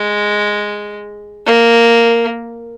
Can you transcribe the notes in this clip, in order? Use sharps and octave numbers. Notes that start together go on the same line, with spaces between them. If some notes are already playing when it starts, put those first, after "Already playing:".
Already playing: G#3
A#3